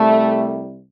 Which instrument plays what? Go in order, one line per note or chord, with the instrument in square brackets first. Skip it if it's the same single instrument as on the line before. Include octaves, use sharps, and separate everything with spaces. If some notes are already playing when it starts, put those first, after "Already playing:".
Already playing: [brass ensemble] C2 C3 G3 A3